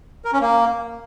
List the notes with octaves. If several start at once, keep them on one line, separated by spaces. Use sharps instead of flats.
A#4
C#4
A#3